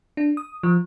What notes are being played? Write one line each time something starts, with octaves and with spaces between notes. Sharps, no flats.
D4
D#6
F3